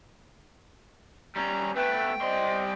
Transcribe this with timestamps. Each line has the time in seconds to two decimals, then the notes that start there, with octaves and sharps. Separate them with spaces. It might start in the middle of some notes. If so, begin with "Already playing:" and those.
1.36 G3 C#4 A#5
1.76 A3 B3 B4 G5
2.21 G3 C5 D5 D#5 C6